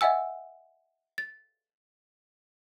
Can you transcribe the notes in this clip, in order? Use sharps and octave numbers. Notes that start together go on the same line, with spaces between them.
D#5 E5 F#5 G#5 E6
A6